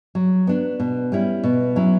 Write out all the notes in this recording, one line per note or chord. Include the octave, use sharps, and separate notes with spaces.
F#3
B3 D4
B2
G3 C#4 E4
B2
F#3 C#4 E4